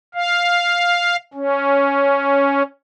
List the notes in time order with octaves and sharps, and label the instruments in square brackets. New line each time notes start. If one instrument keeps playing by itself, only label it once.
[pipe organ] F5
C#4